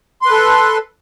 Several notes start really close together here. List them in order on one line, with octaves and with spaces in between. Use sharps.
C6 B4 A4